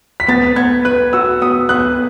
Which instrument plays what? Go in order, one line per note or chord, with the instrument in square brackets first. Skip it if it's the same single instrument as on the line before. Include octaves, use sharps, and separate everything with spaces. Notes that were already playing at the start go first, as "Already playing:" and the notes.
[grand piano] B6
[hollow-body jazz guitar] B3 [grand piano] A6
[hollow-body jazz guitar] B3 [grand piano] G#6
[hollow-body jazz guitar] B4 [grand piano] F#6
[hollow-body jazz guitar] F#4 [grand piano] E6
[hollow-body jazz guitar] B3 [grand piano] D#6
[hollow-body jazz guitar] B3 [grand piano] F#6